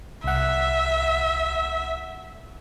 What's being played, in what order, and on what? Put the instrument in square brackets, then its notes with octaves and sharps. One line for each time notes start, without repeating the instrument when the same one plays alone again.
[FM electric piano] C2 F#5 [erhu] E5